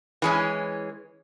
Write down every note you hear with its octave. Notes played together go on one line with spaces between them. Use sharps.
E3 G#3 C#4